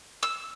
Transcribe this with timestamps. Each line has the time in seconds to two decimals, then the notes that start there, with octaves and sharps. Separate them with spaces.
0.23 E6